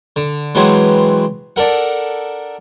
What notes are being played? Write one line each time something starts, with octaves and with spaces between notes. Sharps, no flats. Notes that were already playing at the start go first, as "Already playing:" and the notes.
D3
E3 F#3 G#3 B3 C4
D4 A4 A#4 F#5